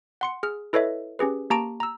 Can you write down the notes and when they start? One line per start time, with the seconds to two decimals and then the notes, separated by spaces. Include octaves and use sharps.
0.21 F#5 C6 C#7
0.43 G#4 F6
0.73 E4 A4 B4 C#5 D#5 E5
1.19 C#4 G4 G#4 B4
1.50 A#3 G4 A5 A#5 C#6 D7
1.80 A#5 E6